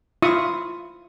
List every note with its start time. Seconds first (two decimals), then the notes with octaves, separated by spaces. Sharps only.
0.22 E4 F4 E5 C#6 D#6